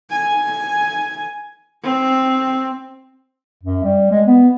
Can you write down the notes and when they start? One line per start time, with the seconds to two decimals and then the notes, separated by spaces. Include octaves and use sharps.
0.10 G#5
1.83 C4
3.63 F#2
3.84 G3
4.11 G#3
4.26 B3